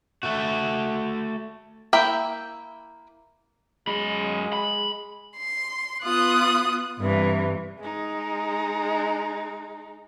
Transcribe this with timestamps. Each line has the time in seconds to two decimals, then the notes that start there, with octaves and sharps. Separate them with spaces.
0.23 A3 F#4
1.93 A#3 E4 E5 G5
3.88 F#2 G#3 B5
4.53 B5
5.37 C6
6.04 B3 F4 D#6 F#6
6.98 G2 C3 E3
7.79 G#3 D#4